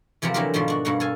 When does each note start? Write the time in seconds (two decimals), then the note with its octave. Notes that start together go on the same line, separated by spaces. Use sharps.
0.22 E2 C3 F3 B3 C4 A#5
0.34 D3 E3 F#3 C4 G4 A#4
0.54 G#2 B2 D#3 F3 G3 C6
0.68 D4 F#4
0.85 G2 B2 A#3 F#5
1.00 A4 F5 G#5